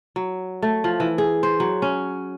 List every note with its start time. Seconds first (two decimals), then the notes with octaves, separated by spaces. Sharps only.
0.16 F#3
0.62 A3
0.84 F3
1.00 E3
1.18 G#4
1.43 C5
1.60 F#3
1.82 C#4